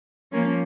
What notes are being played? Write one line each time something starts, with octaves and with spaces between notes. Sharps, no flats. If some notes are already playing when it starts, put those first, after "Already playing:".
F3 A#3 C#4